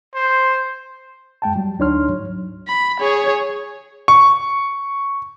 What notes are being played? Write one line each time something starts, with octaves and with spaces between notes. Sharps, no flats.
C5
F#2 G#3 G5 A5
F#3 G3
D2 D4 D#4 C#5 C6 F6
G#2 F#3
B5
G#4 C#5
C#6